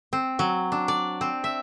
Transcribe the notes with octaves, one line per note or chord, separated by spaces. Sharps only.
C4
F#3
D4
D5
C4
E5